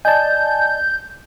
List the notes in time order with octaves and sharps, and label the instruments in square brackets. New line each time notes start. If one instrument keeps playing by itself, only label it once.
[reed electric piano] D5 D#5 [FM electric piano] G#5 A5 [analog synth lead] G6